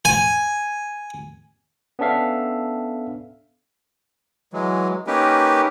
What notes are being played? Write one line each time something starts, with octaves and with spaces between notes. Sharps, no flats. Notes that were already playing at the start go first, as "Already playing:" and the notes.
G#5
B3 C#4 D4 A4 E5 F5
E3 F#3 G#3
A#3 C#4 D#4 G4 A#4 B4